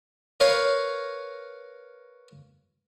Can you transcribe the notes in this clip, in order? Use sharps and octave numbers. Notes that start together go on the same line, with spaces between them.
A#4 B4 C#5 F5 A#5